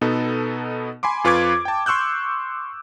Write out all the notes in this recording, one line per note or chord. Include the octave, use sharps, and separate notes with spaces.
B2 B3 D#4 A4
G#5 B5 C6 D6
F2 F4 B4 C#6 D6 G#6
G5 A5
C6 C#6 E6 F#6 G6